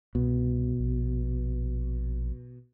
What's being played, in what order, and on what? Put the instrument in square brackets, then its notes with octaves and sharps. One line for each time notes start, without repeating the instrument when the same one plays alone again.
[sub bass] C2 [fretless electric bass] B2
[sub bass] A#1